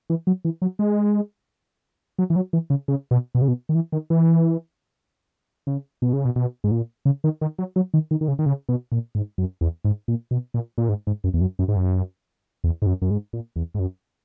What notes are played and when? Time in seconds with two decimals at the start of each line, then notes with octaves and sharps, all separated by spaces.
0.10 E3
0.27 F#3
0.45 E3
0.62 F#3
0.79 G#3
2.18 F#3
2.30 E3
2.36 F#3
2.53 E3
2.70 C#3
2.88 C#3
3.11 B2
3.35 B2
3.42 C#3
3.48 B2
3.69 D#3
3.75 E3
3.92 D#3
4.10 E3
5.67 C#3
6.02 B2
6.13 C#3
6.25 B2
6.36 B2
6.64 G#2
6.71 A#2
7.05 C#3
7.24 D#3
7.41 D#3
7.58 F#3
7.76 F#3
7.94 D#3
8.11 D#3
8.21 D#3
8.28 C#3
8.39 D#3
8.46 C#3
8.69 B2
8.92 A#2
9.15 G#2
9.38 F#2
9.61 E2
9.84 G#2
10.08 A#2
10.31 B2
10.54 A#2
10.78 A#2
10.89 G#2
11.07 G#2
11.24 F#2
11.34 E2
11.41 F#2
11.59 F#2
11.68 G#2
11.76 F#2
12.64 E2
12.82 G#2
12.86 F#2
13.02 F#2
13.10 G#2
13.33 A#2
13.56 E2
13.74 G#2
13.79 F#2